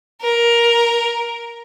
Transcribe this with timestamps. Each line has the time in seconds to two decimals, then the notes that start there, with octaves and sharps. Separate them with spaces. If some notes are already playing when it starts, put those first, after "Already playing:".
0.22 A#4